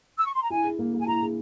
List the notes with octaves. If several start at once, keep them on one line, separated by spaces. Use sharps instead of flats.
E6
C#6
C6
A#5
E4 G#5
G#4
A#3
A#3
G#5
E4 A#5
G#4